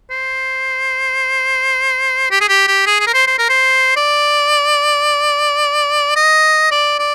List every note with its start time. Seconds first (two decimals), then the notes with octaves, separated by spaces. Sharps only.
0.10 C5
2.31 G4
2.41 G#4
2.48 G4
2.67 G4
2.86 G#4
3.00 G#4
3.07 A#4
3.14 C5
3.27 C5
3.38 A#4
3.49 C5
3.96 D5
6.16 D#5
6.71 D5
6.98 D5